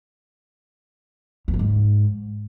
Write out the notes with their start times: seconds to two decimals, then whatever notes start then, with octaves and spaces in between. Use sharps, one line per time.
1.48 E2
1.53 G2
1.59 G#2